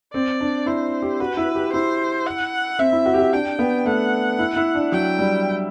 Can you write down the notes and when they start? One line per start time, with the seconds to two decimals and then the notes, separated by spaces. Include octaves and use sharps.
0.13 C4 D5
0.41 D4
0.66 E4 C5
1.02 G4
1.20 F#4 B4
1.37 E4
1.55 G4
1.73 E4 C5
2.26 F#5
2.79 C4 E5
2.92 E4
3.06 F#4
3.14 G4
3.20 F#4
3.33 D4 G5
3.59 B3
3.85 A3 F#5
4.39 E4
4.56 E4
4.75 D4
4.92 F#3 G5
5.19 G3